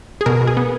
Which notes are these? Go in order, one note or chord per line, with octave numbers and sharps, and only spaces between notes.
G#4
B2 A#4
B2
G#4
B3